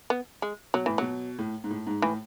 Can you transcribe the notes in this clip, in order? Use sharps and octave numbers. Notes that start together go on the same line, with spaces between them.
B3
G#3
B2 F#3
A2 E3
B2 F#3
A2
G#2
A2
G#2
A2 E3